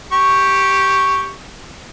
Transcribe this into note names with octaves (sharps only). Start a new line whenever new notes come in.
G4 C#6